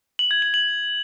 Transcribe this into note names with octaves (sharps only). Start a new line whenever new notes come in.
F#7
G#6
F#7
F#7